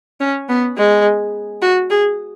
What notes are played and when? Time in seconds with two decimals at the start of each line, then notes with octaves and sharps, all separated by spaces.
0.20 C#4
0.49 B3
0.78 G#3
1.62 F#4
1.90 G#4